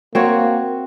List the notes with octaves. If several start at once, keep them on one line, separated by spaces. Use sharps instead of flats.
A#3 C4 F#4 C#5